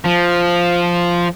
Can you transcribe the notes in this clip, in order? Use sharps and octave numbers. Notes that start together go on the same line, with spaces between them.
F3